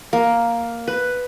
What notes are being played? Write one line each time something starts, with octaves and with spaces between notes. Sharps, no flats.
A#3
B4